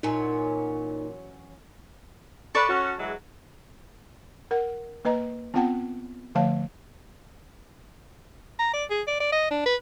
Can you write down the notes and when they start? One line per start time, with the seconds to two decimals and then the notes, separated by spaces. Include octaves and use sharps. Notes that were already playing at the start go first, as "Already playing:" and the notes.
0.03 A#2 E3 F#3 C#4 D#4
2.55 A4 B4 D5 A5 C#6
2.68 C#4 F#4
2.99 E3 F#3 G#3
4.51 A#4 F#5
5.05 A#3 B4 D#5 A#5
5.54 B3 C4 F4 F#5 G5 A5
6.35 D3 F3 A3 C#5 F5 A5
8.59 A#5
8.73 D5
8.90 G#4
9.07 D5
9.20 D5
9.32 D#5
9.51 D4
9.66 B4